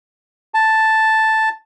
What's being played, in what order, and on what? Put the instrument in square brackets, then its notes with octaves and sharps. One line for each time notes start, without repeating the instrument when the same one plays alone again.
[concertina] A5